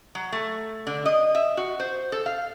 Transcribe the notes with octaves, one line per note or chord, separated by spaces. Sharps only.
F#3
A3
D3
D#5
E5
F#4
C5
A4
F5